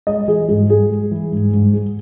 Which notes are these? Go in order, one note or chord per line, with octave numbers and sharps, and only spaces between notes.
G#3 D#5
E3 G#4
G#2 G#4
G#2 G#4
G#3
E3
G#2
G#2
G#3